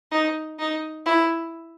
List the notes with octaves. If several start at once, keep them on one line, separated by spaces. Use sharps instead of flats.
D#4
D#4
E4